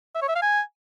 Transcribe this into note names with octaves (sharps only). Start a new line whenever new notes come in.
E5
C#5
E5
F5
G#5